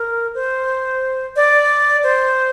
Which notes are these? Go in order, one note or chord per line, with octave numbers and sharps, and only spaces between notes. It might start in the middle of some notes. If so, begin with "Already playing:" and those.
Already playing: A#4
C5
D5
C5